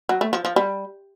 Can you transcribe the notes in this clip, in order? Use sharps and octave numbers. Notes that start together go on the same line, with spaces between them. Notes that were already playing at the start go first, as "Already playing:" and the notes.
F#3
A3
F3
F3
G3